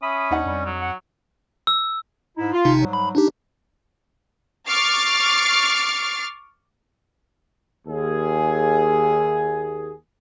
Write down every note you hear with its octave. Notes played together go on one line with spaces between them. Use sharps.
C#4 E5 B5 D#6
D#2 D4 D#4 F#5
F2 G3
F#3
F#5
E6
G#2 D#4 E4
F4
G#1 C3 D#4
G#2 F#3 G3
B5
D4 D#4 G4
C#6 D6 F6 A6 C7 D7
D#2 G#4